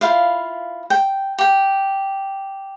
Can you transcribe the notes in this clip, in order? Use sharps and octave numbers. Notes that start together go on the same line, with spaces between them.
E4 F4 F5
G5
G4 G5